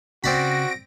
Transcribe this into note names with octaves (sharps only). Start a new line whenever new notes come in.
C#3 C4 F#4 D5 B5 A#6 D7